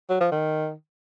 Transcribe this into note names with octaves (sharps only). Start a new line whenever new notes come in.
F#3
F3
D#3